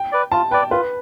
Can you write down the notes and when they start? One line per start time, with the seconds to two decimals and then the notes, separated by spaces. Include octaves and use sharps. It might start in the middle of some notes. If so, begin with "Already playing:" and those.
Already playing: G5
0.12 B4 D5
0.32 F4 A5
0.51 B4 D5 G5
0.71 F4 B4